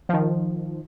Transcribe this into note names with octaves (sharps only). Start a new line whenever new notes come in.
D#3 F3